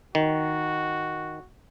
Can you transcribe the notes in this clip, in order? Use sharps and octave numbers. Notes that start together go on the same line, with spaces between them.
D#3 F#4